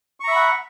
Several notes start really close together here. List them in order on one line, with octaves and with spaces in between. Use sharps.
C#6 A#5 E5 B5 F#5